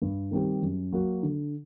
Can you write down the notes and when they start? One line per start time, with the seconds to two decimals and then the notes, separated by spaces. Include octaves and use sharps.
0.02 G2
0.31 D#3 G3 C4 G4
0.62 F#2
0.92 F#3 A#3 F#4
1.23 D3